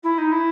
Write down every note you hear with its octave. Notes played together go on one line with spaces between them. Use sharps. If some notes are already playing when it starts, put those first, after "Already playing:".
E4
D#4
E4